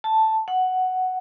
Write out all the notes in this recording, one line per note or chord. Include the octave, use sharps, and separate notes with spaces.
A5
F#5